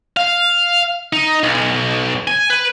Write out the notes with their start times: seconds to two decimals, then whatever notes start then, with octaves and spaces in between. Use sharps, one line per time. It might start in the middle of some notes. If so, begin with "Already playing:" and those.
0.17 F5
1.13 D#4
1.43 B1
2.27 G#5
2.50 B4